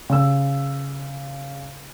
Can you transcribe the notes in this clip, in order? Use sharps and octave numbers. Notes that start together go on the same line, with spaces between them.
C#3 E6